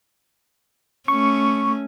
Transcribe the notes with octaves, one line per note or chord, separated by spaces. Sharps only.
A3 C#4 C#6